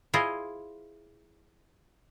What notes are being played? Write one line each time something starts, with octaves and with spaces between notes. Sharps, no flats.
E4 F4 G#4 C5 D#5